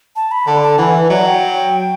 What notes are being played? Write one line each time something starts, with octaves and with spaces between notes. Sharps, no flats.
A5
B5
D3 A5
A5
E3 F#5
E5
F#3 D5
G5